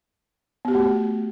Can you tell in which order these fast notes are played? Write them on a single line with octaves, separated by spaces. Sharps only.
B3 G4 F#4 A3